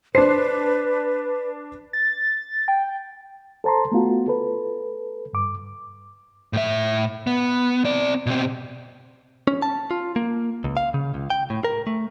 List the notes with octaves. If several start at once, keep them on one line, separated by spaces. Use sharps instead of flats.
D4 B4 C5 A5 C7
A6
G5
A4 C5 A5 A#5 C6
A3 B3 F4 F#4
A4 B4
G2 D6
A2 E5
B3
C4 D5
B2 C4
C#4
A5
F4
A#3
C#2
F5
C#3
C#2
G5
A2
A#4
A3